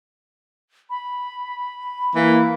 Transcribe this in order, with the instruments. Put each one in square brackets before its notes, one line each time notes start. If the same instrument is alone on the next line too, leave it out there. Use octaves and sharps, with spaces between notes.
[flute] B5
[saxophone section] E3 A#3